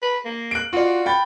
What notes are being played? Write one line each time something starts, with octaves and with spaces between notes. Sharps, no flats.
B4
A#3
F#6 D7
F4 F#4 D5
G5 B5 A6